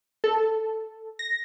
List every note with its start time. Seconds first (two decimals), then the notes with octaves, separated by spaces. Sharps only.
0.24 A4
1.19 A#6